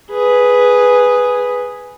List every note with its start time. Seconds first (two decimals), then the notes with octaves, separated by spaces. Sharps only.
0.11 G#4 B4